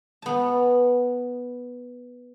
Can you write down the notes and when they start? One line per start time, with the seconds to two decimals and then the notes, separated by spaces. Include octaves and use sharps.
0.22 B3 A5